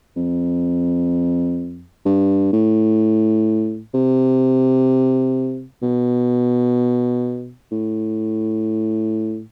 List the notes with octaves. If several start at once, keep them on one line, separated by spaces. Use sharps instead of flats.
F2
G2
A2
C3
B2
A2